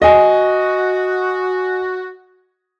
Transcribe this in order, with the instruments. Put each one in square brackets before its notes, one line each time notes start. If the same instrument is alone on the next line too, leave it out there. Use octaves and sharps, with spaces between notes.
[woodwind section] F#4 [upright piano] D#5 G#5